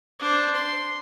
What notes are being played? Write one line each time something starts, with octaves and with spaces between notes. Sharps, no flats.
D4 C5
C6